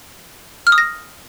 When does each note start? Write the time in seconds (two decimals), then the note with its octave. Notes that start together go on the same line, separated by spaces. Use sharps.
0.67 F6
0.72 D#6
0.78 A#6